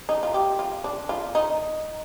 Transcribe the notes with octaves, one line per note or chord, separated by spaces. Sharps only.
D#4
F4
G4
F4
D4
F4
D#4